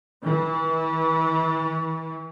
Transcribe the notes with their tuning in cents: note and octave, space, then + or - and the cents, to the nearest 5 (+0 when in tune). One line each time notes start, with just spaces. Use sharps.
E3 -30